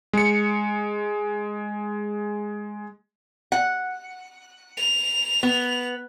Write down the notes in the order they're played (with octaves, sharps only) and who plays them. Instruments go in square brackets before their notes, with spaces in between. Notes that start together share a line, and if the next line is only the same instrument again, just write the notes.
[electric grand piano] G#3 C#7
[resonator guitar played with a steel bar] F#5
[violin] F7
[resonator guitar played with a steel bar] B3